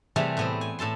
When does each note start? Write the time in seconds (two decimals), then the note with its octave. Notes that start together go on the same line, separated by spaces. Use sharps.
0.16 C3 E3 G3 A3 G4 G#4
0.37 A2 B3 C4
0.61 G#5
0.79 A2 A4 A5 C6